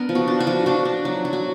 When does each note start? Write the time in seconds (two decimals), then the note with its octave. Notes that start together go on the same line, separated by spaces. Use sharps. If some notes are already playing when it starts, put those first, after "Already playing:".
Already playing: B3 D4 A#4
0.09 F3
0.15 F#4
0.28 D4
0.40 F#4
0.47 F3
0.66 D4 F#4
0.85 D4
1.05 F#3
1.25 F#3
1.33 F#4